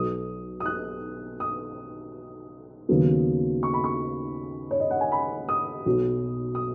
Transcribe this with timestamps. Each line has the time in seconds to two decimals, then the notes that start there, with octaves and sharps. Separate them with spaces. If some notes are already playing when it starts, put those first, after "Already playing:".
Already playing: B1 B2 B3 D#6
0.60 D#6
0.65 F#6
1.40 D#6
2.89 D#2 C#3 F#3 B3
3.63 C#6
3.73 B5
3.84 C#6
4.71 C#5
4.80 D#5
4.90 F#5
5.01 G#5
5.12 B5
5.49 D#6
5.86 B1 B2 F#3
6.55 D#6